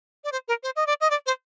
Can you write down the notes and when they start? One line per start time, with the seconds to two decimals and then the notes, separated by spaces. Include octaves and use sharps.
0.24 D5
0.32 C5
0.48 A#4
0.63 C5
0.76 D#5
0.87 D5
1.01 D#5
1.10 D5
1.26 C5